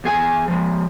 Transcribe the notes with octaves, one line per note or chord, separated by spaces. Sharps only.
E2 G#4 G#5
F3 G#3